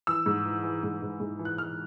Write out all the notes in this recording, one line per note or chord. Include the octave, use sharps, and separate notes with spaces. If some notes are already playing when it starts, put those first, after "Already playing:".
E3 E6
G#2
E3
E3
G#2
G#2
G#2
E3
F#6
E3 F6